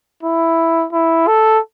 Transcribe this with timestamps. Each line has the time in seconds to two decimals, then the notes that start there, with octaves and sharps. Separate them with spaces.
0.23 E4
0.93 E4
1.27 A4